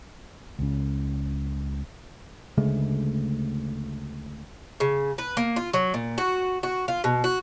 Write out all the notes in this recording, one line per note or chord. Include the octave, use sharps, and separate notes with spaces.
C#2 C#3
D2 C#3 G#3 A3
C#3
B4
A#3
F4
F#3
A#2
F#4
F#4
F4
B2
F#4